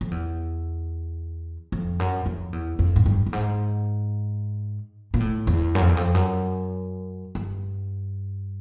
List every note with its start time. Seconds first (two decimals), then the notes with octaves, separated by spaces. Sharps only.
0.01 F2
0.11 E2
1.72 F2
2.00 F#2
2.26 F2
2.53 E2
2.79 F2
2.96 G#2
3.06 G2
3.26 G2
3.33 G#2
5.14 A#2
5.20 A2
5.47 E2
5.75 F#2
5.81 F2
5.89 E2
5.97 F2
6.15 F#2
7.35 G2